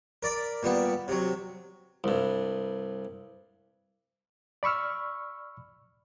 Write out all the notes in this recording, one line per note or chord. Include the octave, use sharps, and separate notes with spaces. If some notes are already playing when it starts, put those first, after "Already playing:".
A#4 D5 B5
A#2 G3 B3
C3 F#3
C2 G2
D5 B5 C#6 E6 F6